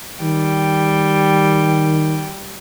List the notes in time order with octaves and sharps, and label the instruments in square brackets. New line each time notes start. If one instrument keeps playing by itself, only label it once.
[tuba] D#3 [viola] G3 G5